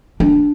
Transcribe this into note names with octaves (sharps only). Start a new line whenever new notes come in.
D4